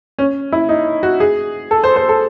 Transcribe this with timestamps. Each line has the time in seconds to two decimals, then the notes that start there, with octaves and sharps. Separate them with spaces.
0.18 C#4
0.52 E4
0.69 D#4
1.03 F#4
1.20 G#4
1.71 A4
1.84 C5
1.96 C5
2.09 A4